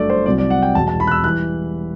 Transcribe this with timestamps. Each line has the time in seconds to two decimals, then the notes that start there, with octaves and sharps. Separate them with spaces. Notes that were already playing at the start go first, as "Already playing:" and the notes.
Already playing: G1 F#2 D3 F#3 A3 D5
0.10 C5
0.26 C2 C3 F#3 C4 D5
0.38 D5
0.50 F#5
0.62 G5
0.75 E1 E2 B2 A5
0.88 A5
1.00 B5
1.07 F#6
1.11 E6
1.24 E3 G3 F#6